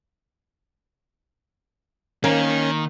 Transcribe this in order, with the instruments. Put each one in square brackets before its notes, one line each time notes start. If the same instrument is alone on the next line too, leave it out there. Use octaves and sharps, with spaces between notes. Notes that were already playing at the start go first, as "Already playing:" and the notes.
[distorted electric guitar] D#3 [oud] A#3 [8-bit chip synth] C#4